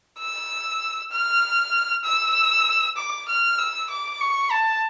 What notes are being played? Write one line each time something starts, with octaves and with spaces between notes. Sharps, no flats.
E6
F6
E6
D6
F6
E6
D6
C#6
A5